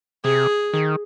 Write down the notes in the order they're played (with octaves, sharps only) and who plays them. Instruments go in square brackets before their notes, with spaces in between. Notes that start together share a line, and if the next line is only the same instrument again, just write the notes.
[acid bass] C3 [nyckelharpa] G#4
[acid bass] D#3